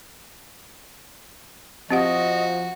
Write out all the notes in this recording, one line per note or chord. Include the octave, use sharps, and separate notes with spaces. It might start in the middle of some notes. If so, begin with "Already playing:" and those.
F3 C4 F#4 G4 D#5 F#5